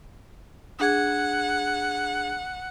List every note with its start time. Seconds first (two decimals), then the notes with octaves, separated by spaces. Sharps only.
0.80 D4 G#4 F#5 G#6